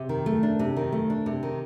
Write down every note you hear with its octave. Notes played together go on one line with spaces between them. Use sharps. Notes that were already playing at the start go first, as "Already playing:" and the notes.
Already playing: C3
D#3
A3
D4
C3
D#3
A3
D4
C3
D#3